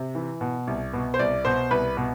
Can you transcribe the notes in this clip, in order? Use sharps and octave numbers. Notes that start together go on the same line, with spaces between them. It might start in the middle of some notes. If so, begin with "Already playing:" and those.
Already playing: C3
E3
B2
C2
B2
C5
C2 D5
B2 C5
C2 B4
B2